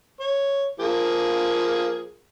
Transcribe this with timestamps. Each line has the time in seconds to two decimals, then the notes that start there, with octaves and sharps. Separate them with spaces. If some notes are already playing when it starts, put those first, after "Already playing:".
0.20 C#5
0.80 F3 A#3 G#4